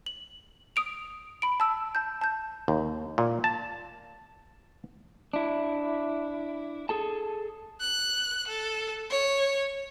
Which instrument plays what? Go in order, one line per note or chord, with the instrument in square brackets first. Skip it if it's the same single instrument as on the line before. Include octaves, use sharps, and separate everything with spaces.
[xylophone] F#7
D#6 D7 F7
B5 D7
A5 E6
A5 G6
A5 G6
[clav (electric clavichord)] D#2
A#2
A5
[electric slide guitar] D4 E4
G#4 A4 A5
[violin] F#6
A4
C#5